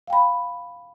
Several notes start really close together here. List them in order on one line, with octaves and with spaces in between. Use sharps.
F5 G5 B5